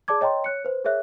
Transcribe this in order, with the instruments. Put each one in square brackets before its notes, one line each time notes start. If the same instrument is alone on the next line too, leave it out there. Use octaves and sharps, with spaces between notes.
[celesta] G#4 D5 A5 D6 G#6
C#5 D#5 G5 A#5 C6
C#5 F#6 C#7
B4 C5
G#4 A#4 C#5 E5 F#6